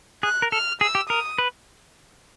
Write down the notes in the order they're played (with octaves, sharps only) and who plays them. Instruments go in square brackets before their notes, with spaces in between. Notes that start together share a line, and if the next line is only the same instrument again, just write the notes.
[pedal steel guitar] G#4 [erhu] F#6
[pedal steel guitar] A#4
[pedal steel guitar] A4 [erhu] F6
[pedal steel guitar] G#4 [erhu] E6
[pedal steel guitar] G4
[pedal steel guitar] A#4 [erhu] D#6
[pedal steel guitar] B4